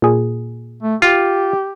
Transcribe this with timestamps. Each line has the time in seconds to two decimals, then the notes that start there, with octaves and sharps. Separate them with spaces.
0.02 A#2 G#4
0.82 A3
1.02 F4 G4